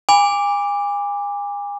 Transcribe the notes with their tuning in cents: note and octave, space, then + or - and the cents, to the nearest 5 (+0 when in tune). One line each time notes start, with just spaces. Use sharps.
G#5 -35 B5 +0 D6 +0